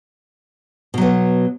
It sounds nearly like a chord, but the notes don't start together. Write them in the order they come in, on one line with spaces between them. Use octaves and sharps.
B2 F#3 B3